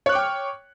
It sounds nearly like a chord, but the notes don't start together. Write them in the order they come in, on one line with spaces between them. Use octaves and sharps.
C#5 F#6 D6 G5 F6